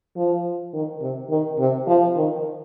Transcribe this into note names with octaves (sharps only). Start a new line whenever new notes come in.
F3
D#3
C3
D#3
C3
F3
D#3